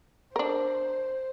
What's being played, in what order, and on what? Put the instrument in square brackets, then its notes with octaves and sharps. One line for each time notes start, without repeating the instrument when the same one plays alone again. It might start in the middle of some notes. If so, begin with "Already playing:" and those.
[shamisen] D4 A#4 [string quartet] C5